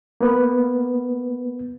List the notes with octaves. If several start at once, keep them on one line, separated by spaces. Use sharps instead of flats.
A#3 B3 B4